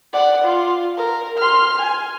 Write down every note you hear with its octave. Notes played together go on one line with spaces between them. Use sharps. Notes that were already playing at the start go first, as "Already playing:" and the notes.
D5 F#5
F4
A#4
C6 F6
G#5